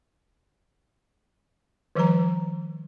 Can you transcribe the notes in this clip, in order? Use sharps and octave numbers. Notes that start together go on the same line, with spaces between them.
D#3 F3 G3 B4 A#5